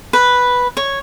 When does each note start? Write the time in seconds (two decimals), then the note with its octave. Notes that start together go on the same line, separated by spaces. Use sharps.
0.13 B4
0.77 C#5